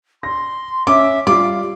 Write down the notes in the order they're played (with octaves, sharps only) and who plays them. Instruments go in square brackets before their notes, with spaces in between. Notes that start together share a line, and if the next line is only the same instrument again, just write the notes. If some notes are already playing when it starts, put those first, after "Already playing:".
[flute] C6 [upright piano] A#6
[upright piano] C#4 [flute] E5 [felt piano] D6
[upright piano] G3 F4 [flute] F5 [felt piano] D6